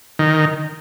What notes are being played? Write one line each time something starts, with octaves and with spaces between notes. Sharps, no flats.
D#3